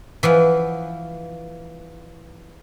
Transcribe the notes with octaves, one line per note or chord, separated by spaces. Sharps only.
E3 F3 F#5